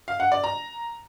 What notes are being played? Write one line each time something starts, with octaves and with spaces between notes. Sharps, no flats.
F5
F#5
D5
A#5